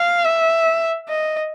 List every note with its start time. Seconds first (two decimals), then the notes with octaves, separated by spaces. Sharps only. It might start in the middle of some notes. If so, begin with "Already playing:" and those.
Already playing: F5
0.25 E5
1.09 D#5